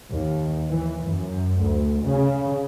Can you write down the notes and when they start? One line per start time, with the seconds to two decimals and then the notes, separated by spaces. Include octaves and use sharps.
0.12 D#2
0.69 E3
1.07 F#2
1.62 D2
2.05 C#3